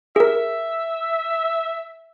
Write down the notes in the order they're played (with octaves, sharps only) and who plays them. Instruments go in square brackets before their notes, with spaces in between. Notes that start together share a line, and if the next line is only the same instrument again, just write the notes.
[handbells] G#4 A#4 [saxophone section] E5